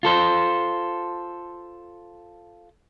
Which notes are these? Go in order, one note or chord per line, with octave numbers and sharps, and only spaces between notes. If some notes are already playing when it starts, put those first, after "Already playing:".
F4 A4 C5